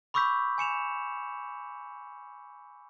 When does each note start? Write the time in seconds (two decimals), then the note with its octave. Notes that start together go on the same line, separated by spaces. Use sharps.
0.14 B5 C#6 D6 E6 G6 B6
0.58 G#5 C#7 E7 F7